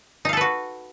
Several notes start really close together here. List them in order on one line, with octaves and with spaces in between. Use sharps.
D#4 F5 A4 B4 F#4